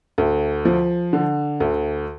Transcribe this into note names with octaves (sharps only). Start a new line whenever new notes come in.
D2
F3
D3
D2